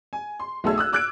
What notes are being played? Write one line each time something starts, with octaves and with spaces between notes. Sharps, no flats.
G#5
C6
B1 A3 G#4 A4 E6 G#6
D#6 E6 F#6
D6 E6 F#6 G#6 D7